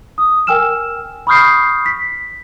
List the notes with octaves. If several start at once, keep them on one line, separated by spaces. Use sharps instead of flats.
D#6
A#4 G5 G#5 E6 F6 E7
B5 C#6 D#6 F6 G6 C7
B6